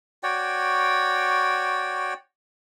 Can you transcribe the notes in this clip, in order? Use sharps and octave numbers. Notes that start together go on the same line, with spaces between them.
F#4 C#5 D5 G5